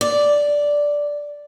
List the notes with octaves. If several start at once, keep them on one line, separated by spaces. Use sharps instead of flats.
D5